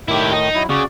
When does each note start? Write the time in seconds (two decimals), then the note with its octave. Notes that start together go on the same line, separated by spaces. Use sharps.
0.08 A2 D#3 E4 G4
0.33 D#4
0.55 F#3 E4
0.69 C#3 F#4 D5